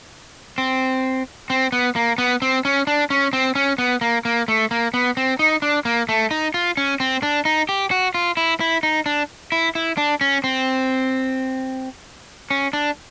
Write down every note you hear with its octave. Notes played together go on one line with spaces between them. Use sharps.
C4
C4
B3
A#3
B3
C4
C#4
D4
C#4
C4
C#4
B3
A#3
A#3
A3
A#3
B3
C4
D#4
D4
A#3
A3
D#4
F4
C#4
C4
D4
D#4
G4
F#4
F4
E4
E4
D#4
D4
E4
E4
D4
C#4
C4
C#4
D4